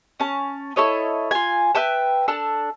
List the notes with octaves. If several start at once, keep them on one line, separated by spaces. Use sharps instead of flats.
C#4 A5
E4 A4 C#5 D#5
F4 G#5
B4 E5 G5 A5
D4 A4 A5